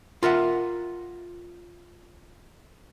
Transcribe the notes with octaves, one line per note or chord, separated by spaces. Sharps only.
F4 A#4 E5 F#5